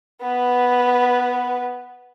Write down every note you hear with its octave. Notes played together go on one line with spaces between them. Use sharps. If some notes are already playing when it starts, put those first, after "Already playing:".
B3 B4